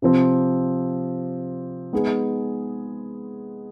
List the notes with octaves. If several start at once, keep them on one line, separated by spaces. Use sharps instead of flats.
C3 F3 C4
G#3 B3 D#4 G#4